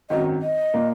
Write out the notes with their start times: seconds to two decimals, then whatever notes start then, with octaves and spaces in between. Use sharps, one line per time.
0.10 G#1 F#2 D#3 F#3 D#5
0.42 D#5
0.74 A#2 A#3